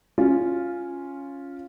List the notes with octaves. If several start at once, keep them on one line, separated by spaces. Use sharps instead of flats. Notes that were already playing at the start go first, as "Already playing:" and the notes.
C#4 F4